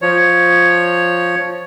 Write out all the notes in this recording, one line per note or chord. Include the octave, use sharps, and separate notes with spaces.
F3 C#5